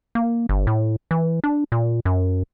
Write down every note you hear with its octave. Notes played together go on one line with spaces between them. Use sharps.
A#3
G1
A2
E3
D4
A#2
F#2